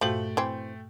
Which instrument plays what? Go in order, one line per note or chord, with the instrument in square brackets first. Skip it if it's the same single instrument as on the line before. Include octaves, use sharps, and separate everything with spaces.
[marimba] G2 A#2 F#4 [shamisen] F3 [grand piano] A3 G5 F#7
[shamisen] E3 C4